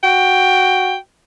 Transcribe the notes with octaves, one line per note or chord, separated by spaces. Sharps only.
F#4 G5